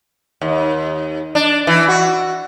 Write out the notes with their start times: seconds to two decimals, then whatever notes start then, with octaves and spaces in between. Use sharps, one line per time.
0.41 D#2
1.35 D4
1.67 E3
1.88 F#4